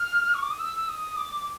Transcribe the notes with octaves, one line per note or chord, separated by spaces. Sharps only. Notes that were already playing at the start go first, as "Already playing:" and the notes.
Already playing: F6
C#6
D6
D#6
E6
E6
D#6
D6